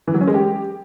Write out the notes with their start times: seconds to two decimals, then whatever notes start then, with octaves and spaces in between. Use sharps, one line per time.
0.07 E3
0.14 F#3
0.21 C#4
0.28 G#3
0.34 G4